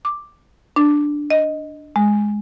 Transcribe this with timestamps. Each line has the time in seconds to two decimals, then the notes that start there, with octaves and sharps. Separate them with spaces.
0.05 D6
0.76 D4
1.30 D#5
1.96 G#3